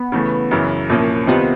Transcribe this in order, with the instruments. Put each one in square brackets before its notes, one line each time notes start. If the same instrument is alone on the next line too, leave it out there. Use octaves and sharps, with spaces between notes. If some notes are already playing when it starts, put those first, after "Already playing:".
Already playing: [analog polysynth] B3
[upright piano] C#3 E3 A3
F#2 C#3 E3
C2 A#2 F3 A#3 C#4
[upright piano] C3 D#3 G3 C4 F4 [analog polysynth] B3